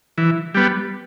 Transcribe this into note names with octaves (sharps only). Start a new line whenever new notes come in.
E3
G3 B3